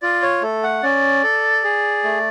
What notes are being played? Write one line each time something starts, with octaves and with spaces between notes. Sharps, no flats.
F4 D5
C#5
A3 A4
F#5
C#4 D5
A4
G#4
A3